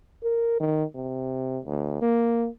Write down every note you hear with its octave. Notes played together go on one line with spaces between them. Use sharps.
A#4
D#3
C3
D2
A#3